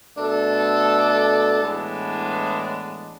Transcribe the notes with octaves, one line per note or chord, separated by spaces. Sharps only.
B2 A3 D4 A4
A2 E3 G#3 B3 D4